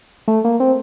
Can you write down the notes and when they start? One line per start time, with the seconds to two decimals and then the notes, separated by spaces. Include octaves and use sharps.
0.28 A3
0.44 A#3
0.60 C4